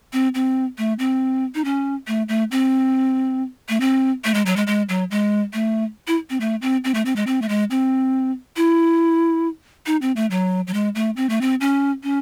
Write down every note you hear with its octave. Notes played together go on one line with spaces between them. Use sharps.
C4
C4
A3
C4
D#4
C#4
A3
A3
C4
A3
C4
A3
G#3
F#3
G#3
G#3
F#3
G#3
A3
E4
C4
A3
C4
C4
A3
C4
G#3
C4
A3
G#3
C4
E4
D#4
C4
A3
F#3
F#3
G#3
A3
C4
A3
C4
C#4
C#4